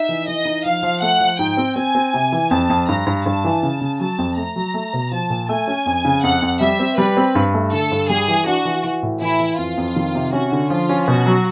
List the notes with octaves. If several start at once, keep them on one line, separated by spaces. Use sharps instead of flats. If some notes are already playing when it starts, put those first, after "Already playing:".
Already playing: D#4 E5
E3
E3 D#5
D#4
F3 F5
F3
A3 F#5
F3
G#2 G5
C4
C4 G#5
C4
C3
E3
F2 A5
F2
G2 A#5
G2
G2 A5
E3
C#3
C#3
F#3 A5
F2
A3 A#5
F#3
A3
B2
F3 A5
A#2
A3 G#5
C#4
F2
C#3
F2 F#5
F2
G3 E5
C4
G3 B4
C4
G2
A3
D3 A4
G2
G3 G#4
E3
D4 F#4
E3
E3
A2
E3 E4
E3
F2 F4
F2
D#3
C3
C#4 F#4
D3
F3 F4
C#4
B2 F#4
F#3